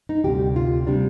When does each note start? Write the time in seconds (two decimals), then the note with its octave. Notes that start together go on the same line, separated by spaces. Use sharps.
0.09 D#4
0.24 D2 C3 G3 G4
0.56 F4
0.87 C3 G3 D4